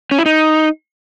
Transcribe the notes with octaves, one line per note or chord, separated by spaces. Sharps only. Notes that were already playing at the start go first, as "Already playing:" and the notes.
C#4
E4
D#4